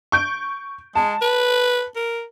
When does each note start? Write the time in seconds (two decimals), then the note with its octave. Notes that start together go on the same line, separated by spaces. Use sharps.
0.12 C#6 G6 D7
0.96 G#3 A5
1.21 B4
1.96 A#4